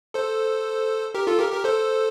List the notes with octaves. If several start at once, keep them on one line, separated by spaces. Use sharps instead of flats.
A4 C5
G4 A#4
F4 A4
G4 A#4
G4 A#4
A4 C5